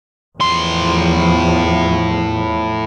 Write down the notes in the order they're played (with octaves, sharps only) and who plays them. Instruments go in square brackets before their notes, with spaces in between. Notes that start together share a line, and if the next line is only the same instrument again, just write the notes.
[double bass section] E2 F3 [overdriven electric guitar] A2 C6